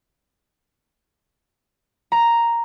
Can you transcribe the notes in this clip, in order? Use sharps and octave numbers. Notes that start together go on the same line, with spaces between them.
A#5